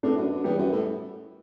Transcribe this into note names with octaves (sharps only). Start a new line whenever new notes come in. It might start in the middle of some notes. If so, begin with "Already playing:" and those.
A2 B3 D4
F#2
F#2
E2 G3 B3
F#2
A2